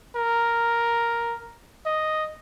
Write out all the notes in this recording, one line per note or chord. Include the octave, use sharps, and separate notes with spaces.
A#4
D#5